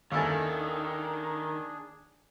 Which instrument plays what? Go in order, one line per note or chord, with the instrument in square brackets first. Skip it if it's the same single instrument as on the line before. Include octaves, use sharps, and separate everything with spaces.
[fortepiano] D#2 G#5 [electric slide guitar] D#3 [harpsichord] C#4 E4 A4 [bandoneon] D4 G#4